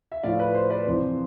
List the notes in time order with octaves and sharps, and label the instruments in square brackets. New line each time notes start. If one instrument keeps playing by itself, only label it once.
[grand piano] E5
A2 F3 D5 F5
B4
C5
B4 D5
F2 C3 E3 C5